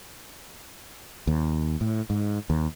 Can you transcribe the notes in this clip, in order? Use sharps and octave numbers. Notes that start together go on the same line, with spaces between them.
D#2
A2
G#2
D#2